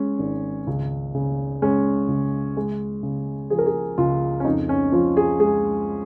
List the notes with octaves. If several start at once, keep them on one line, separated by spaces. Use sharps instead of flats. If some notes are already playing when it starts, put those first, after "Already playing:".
Already playing: G#3 C#4
G#1
C#2
C#3
G#3 C#4
C#2
G#3
C#3
F3 G#4
A#4
G#4
C#2 F4
C#4
F2 D#4
C#4
F3 F4
G#4
G#3 G#4